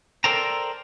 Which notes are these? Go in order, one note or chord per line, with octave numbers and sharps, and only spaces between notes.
A4 A#4 C5 D5 G5 A#5